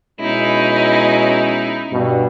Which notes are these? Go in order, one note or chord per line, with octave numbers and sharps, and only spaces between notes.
B2 G#3 C#4 D#4 E4
G2 B2